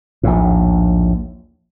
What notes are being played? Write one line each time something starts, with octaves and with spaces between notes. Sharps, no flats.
A#1 D#2 A2